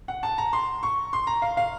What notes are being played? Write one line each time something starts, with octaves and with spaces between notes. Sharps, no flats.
F#5
A5
A#5
C6
C#6
C6
A#5
F5
F5